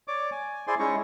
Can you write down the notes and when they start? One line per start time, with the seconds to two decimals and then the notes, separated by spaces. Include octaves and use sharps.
0.08 C#5 D5 D6
0.32 G#5
0.67 E4 G#4 C5 D5 G#5 C6
0.79 G#3 C#4 D#4 E4 A#5 C#6